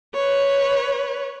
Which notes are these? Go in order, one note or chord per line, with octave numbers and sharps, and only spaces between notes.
B4 C#5